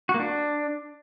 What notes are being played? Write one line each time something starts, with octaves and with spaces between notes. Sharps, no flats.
F#4
A#3
D4